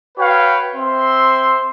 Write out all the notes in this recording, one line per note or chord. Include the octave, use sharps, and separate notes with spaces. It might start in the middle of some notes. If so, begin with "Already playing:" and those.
F#4 B4 C#5 F5 G5
C4 C5 E5 C6